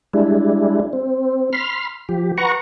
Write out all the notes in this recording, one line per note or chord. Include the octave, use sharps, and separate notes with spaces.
G3 G#3 D4 E4
C4
B5 C6 F6
F3 G4
B4 F#5 A#5 C#6